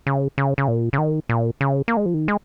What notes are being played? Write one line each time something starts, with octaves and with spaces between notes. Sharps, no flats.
C#3
C#3
C#3
A#2
C#3
D#3
A#2
C#3
A#3
G#3
F3
D#3
G#3